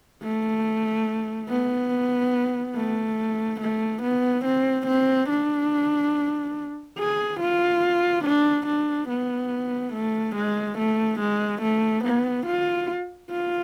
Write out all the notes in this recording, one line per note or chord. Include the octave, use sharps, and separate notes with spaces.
A3
B3
A3
A3
B3
C4
C4
D4
G#4
F4
D4
D4
B3
A3
G#3
A3
G#3
A3
B3
F4
F4